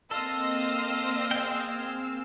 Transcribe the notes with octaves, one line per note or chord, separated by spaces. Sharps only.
A#3 C4 A4 D#5 F5 C6 E6 A#6
G#4 G5